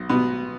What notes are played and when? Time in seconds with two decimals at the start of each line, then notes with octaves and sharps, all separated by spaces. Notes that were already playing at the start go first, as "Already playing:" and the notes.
Already playing: B1
0.09 B2 B3